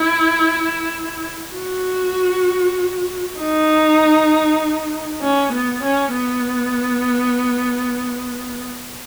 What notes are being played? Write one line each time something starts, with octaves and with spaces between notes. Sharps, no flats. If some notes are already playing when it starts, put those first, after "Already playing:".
Already playing: E4
F#4
D#4
C#4
B3
C#4
B3